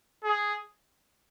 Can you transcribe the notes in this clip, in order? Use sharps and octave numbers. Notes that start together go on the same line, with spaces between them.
G#4